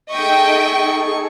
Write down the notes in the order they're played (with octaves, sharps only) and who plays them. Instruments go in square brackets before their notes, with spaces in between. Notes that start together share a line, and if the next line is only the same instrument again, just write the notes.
[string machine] D#4 G#4 A4 [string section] D#5 E5 G5 [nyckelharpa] C#6